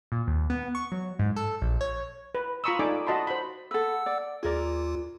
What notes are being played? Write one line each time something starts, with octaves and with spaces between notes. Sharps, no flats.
A#2
D#2
B3
C#6
F#3
G#2
A4
A#1
C#5
B4
F4 A#5 B5 C#6 D#6 E6
D#4 A4 D5 G#5 D6
F#4 D#5 A5 B5 C6
C5 B5
A4 B4 F#5 E6
D5
D#2 F4 G#4 A#4 D5